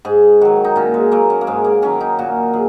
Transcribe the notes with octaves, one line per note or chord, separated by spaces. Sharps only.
G#2 G#4
D#3 F#3 F#4
D#4
A#2 C#4
G#3
F#3 A#3
C#4
A#3
G#2 G#3
A#3
D#3 F#3 C#4
D#4
A#2 F#4
F#3 G#4